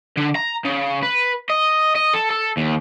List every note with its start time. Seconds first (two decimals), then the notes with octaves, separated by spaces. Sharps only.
0.17 D3
0.36 A#5
0.65 C#3
1.03 B4
1.50 D#5
1.95 D#5
2.13 A4
2.30 A4
2.57 D#2